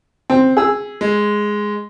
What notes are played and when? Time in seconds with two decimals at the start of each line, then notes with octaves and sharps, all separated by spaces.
0.30 C4
0.57 G#4 E6
1.01 G#3